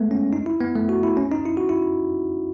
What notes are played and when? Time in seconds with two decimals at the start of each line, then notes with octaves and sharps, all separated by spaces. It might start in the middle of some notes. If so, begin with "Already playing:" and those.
Already playing: G#3 A3 B3
0.11 C#4
0.33 D#4
0.46 E4
0.60 B3
0.75 A3
0.89 F#4
1.03 E4
1.17 C#4
1.32 D#4
1.46 E4
1.57 F#4
1.69 E4